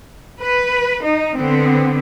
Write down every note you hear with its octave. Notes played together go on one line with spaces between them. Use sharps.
B4
D#4
D3 B3 C4